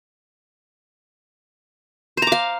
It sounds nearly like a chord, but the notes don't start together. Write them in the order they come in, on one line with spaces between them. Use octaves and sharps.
C5 A#5 D6 F5